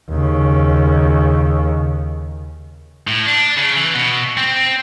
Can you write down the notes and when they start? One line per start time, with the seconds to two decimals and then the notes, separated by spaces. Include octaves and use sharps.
0.11 D#2 C#3
3.07 A2
3.26 D4
3.57 C#3
3.76 E3
3.94 B2
4.37 C4